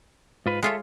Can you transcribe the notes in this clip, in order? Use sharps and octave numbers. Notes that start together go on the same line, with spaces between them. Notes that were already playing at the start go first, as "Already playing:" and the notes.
G#2 F4 B4
G#3 F4 A4 C#5 E5